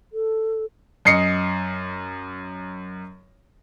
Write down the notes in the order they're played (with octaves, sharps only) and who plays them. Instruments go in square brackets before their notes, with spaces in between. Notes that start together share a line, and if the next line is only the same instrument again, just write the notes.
[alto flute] A4
[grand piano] F#2 D#5 C7 C#7